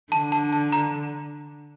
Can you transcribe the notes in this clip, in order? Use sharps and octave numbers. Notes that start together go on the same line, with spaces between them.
D3 A5
A5
A5
A#5